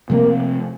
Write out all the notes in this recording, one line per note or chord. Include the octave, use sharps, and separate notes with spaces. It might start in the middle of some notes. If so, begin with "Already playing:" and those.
C3 F3 A3 A#3 C4